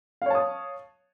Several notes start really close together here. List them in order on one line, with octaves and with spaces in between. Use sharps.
F5 C#5 A5 D#6